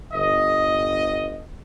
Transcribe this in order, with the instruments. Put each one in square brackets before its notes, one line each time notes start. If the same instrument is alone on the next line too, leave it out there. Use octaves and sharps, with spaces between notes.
[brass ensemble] G1 D#5